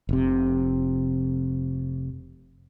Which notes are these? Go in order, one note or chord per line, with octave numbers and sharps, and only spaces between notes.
F1 C3